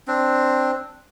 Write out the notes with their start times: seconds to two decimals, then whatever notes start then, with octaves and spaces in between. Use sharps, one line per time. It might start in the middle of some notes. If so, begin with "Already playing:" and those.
0.08 C4 D4